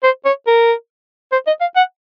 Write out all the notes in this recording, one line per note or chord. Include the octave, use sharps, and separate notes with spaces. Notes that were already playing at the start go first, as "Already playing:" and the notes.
C5
C#5
A#4
C5
D#5
F5
F#5